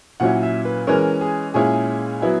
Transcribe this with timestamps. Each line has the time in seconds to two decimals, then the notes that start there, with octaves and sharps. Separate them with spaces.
0.20 A#2 F#3 C#4 E4 F#5
0.43 E5
0.65 B4
0.87 E3 G#3 C#4 A#4
1.21 G#4
1.54 A#2 G#3 C#4 E4 G#4
2.22 F#3 B3 E4